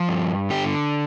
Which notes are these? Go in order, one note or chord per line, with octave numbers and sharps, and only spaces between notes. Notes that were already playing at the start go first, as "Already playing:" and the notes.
Already playing: F3
G2
D3 G4